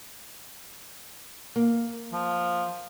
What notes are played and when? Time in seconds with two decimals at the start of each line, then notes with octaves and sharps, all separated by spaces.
1.56 A#3
2.13 F3